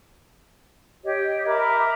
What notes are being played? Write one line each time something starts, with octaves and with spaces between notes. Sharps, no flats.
G4 C#5 D#5
A#4 E5 B5 D6